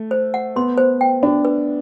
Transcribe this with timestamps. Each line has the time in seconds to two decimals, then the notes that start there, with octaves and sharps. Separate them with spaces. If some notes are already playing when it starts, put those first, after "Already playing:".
Already playing: A3
0.11 C5
0.34 F#5
0.56 B3 C6
0.78 C5
1.01 G5
1.23 D4 F#4
1.45 B4